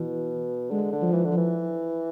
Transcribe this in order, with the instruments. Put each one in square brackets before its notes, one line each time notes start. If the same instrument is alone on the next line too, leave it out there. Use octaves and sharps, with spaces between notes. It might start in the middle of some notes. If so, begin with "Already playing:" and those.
Already playing: [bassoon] B2 [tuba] E3
[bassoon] D3 [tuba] G#3
[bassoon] D3
[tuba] F3
[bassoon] E3
D3
[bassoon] E3 [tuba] F3